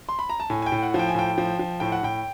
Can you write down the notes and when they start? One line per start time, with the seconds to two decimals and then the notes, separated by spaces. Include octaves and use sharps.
0.09 C6
0.19 B5
0.30 A#5
0.40 A5
0.50 A2 G#5
0.62 G#5
0.66 G5
0.72 A2
0.82 F#5
0.94 F3
0.99 G5
1.09 G#5
1.15 A2 G5
1.38 F3
1.59 F3
1.80 A2 G5
1.92 F#5
2.03 A2 G5